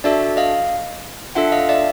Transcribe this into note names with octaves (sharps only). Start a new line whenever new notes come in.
D4 F#4 A4 D5 E5
D#5 F5
D4 F4 A4 E5 F#5
D#5 F5
D5 E5